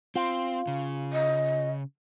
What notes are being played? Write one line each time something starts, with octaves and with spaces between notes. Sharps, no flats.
C4 F4
C#3
D#5